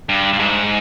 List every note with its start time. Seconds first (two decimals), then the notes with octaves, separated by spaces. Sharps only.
0.09 G2
0.33 G2
0.39 G#2